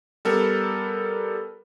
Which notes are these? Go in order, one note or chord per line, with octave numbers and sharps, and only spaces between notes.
G3 B3 A4 A#4